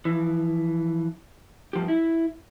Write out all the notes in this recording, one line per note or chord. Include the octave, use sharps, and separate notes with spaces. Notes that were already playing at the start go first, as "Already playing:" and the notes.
E3 F3
G2 F3 G4
E4